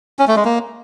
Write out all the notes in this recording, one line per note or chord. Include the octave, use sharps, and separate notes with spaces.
C#4
A3
G#3
A#3